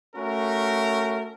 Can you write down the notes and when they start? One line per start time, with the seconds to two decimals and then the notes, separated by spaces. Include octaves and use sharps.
0.16 A3 C#4 F#4 A#4